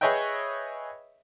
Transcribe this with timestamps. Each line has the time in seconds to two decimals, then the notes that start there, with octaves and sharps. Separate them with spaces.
0.01 G#4 B4 C#5 D#5 E5 G5